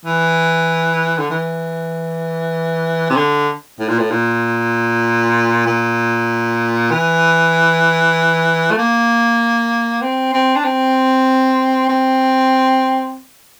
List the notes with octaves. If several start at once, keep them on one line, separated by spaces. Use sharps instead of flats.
E3
D3
E3
C3
D3
A2
A#2
A2
A#2
A#2
E3
A3
A#3
C4
C4
D4
C4
C4